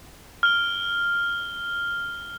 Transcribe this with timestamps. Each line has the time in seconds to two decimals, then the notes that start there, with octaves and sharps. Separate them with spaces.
0.43 F6 G7